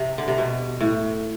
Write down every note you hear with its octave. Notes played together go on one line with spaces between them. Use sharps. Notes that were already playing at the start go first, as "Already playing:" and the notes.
Already playing: C3
D3
C3
B2
A2